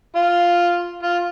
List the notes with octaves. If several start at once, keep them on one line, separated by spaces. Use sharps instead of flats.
F4
F4